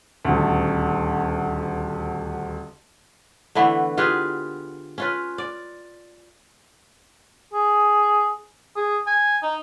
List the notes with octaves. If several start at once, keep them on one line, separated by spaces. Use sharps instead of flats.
D#1 D2
D3 E3 A3 B3
F4 G4 G#4 B4
C#4 F4 B4
D5
G#4
G#4
G#5
D#4